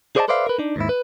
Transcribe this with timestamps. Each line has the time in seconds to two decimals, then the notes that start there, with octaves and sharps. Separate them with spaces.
0.16 G#4 C5 D5 D#5 F5 A5
0.28 A4 B4 C5 D5 E5 F5
0.47 A#4 B4
0.58 D4 D#4
0.76 D#2 G#2 E4
0.89 B4